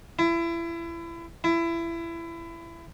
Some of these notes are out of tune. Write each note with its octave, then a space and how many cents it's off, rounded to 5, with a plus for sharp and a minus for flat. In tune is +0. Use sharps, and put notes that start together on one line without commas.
E4 +30
E4 +25